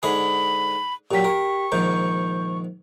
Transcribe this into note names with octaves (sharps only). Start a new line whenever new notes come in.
G#2 D3 G#4 B5
A#2 F#3 G4 G5 B6
A#4 C#6
A#1 G#2 D#3 G6